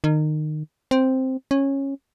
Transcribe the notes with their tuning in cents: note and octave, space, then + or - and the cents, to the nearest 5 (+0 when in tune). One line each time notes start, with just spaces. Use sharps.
D#3 -25
C4 +0
C#4 -15